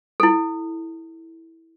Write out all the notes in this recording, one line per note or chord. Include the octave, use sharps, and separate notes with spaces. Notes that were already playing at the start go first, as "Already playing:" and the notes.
E4 A4